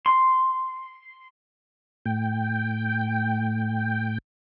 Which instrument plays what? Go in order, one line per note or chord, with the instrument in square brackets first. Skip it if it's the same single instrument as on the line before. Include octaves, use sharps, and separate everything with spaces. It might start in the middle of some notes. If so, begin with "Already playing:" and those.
[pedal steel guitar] C6
[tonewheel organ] A2 G5